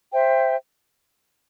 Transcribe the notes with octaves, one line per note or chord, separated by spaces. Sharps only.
C5 E5 G5